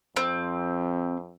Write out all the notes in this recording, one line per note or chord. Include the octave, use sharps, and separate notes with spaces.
F2 C4